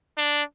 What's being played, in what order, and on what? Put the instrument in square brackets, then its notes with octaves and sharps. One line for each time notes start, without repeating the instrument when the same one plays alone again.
[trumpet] D4